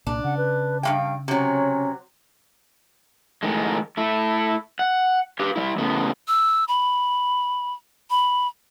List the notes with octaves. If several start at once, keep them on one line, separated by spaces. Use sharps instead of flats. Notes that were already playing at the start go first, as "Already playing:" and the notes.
C2 A#2 D4
C#3 F#5
B4
G2 A#3 F5 G5
C3 F#3 C#4
A2 D#3 G#3
A3 E4
F#5
G4 B4 F5
G3 E4
A2 C#3 B3
E6
B5
B5